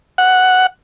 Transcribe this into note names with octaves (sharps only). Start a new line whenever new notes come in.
F#5